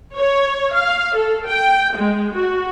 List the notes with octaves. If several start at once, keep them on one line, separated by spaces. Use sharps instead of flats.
C#5
F5
A4
G5
G#3
F#4